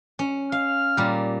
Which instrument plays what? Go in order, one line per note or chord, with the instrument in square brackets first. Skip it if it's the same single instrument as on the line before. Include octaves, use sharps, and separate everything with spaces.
[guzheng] C#4
[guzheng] F5 [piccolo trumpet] F6
[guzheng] A#2 G3